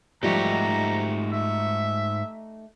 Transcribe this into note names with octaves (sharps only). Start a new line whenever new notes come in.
G#2 F3 G3 A3 D#4 F#4 G4 A#5
E5